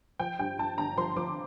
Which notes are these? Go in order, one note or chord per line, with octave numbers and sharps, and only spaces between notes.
F3 G5
G2 G5
G2 A5
G1 A#5
F3 C6
F3 D6